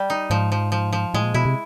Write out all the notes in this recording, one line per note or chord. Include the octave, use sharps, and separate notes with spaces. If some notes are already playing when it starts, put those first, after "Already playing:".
Already playing: G3
D#4
G#2 F3
F3
F3
F3
A2 G#3
A#2
B2 E4
C3